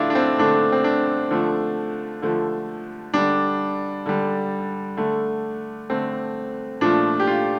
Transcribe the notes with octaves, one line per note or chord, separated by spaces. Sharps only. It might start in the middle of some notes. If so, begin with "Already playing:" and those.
Already playing: D3 A3 D4 E4 F4
D4
C4
D3 A3 D4
C4
D4
D3 F3 A3
D3 F3 A3
D3 G3 D4
D3 G3
D3 A3
D3 A3 C4
A#2 F3 A3 D4
G4
F4